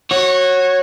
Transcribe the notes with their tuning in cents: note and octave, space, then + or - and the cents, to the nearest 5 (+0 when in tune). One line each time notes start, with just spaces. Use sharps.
F#4 +0 C#5 -20